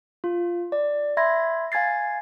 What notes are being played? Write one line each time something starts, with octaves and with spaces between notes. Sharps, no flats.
F4
D5
E5 B5 C6 G#6 A#6
F5 G#5 G#6 A6 C7